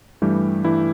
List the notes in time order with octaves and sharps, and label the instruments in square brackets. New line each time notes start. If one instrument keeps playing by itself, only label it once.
[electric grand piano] G2 E3 G3 A3 G4
G2 E3 A3 E4